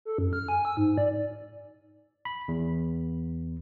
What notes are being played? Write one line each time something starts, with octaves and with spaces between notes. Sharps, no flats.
A4
F#2
F6
G#5
E6
G#2
D5
B5
E2